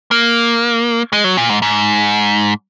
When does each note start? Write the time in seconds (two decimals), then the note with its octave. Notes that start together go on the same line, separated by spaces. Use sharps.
0.11 A#3
1.13 G#3
1.24 F#3
1.37 A#2
1.50 G#2
1.62 G#2